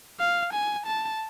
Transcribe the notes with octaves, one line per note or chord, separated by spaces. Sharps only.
F5
G#5
A5